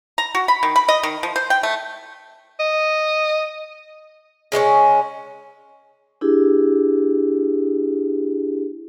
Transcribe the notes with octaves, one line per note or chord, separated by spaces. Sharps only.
A#5
F#4
B5
D#3
B5
D#5
D#3
F3
C5
G5
A3
D#5
C#3 G#3 A3 C#4
D4 E4 G4 G#4